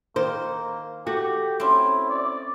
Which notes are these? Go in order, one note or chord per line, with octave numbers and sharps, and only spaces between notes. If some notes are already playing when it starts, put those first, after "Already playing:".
D#3 A#3 C5
A3 F#4 G4
C4 C#4 E4
D5